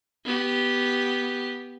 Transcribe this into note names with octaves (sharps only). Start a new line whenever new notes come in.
B3 G4